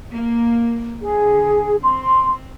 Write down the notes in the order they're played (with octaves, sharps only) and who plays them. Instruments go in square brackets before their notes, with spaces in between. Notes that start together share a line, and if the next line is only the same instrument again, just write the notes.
[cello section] A#3
[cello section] D3 [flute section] G#4
[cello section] C4 [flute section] C6